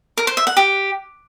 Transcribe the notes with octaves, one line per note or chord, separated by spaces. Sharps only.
A#4
C5
E5
F#5
G4